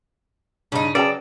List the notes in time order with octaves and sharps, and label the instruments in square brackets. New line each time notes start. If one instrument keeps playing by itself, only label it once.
[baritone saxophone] G2 [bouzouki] C#3 D#4
[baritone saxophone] C#3 [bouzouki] F#3 [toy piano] B4 G5 A5 [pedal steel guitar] D5